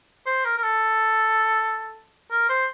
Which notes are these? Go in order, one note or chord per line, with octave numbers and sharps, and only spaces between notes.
C5
A#4
A#4
A4
A#4
C5